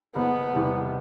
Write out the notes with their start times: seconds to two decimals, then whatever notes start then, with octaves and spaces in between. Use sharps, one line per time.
0.15 F#1 B3
0.53 E2 C3 E3 G3